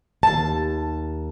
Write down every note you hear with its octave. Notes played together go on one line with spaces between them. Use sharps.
D#2 A5